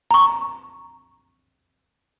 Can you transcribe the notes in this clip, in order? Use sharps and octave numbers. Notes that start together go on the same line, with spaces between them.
A#5 C#6